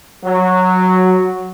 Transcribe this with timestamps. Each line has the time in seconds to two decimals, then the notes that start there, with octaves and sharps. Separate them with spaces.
0.24 F#3